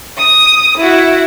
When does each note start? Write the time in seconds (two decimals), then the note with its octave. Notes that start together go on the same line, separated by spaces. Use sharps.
0.18 D#6
0.78 E4 F#4